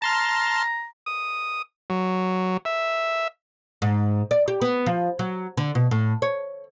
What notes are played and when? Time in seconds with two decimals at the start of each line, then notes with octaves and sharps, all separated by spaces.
0.02 A5 A#5 C6 F6
1.06 D#6
1.90 F#3
2.65 E5
3.82 G#2
4.31 D5
4.48 G4
4.61 B3
4.86 F3
5.19 F#3
5.57 D3
5.75 B2
5.91 A2
6.22 C#5